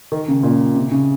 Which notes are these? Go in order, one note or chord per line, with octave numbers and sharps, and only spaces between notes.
D#3
C#3
A#2
C3
C#3